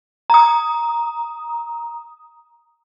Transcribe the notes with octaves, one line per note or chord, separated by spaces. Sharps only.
A#5 D#6